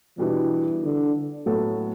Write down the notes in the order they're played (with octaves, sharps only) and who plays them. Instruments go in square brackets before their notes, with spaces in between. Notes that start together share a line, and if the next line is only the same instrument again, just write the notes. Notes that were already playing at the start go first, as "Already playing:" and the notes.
[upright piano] B2 G3 D4 [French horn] E3
[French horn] D3
[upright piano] A2 F#3 B3 F#4 A4